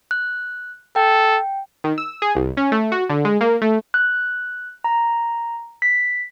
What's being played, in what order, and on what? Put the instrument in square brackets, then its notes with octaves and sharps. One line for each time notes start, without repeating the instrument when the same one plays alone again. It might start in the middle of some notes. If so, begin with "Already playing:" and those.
[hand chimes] F#6
[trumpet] A4 [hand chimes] G5
[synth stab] D#3
E6
G#4
C2
C#4
A3
F#4
D3
G#3
A#3
A3
[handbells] F#6
A#5
B6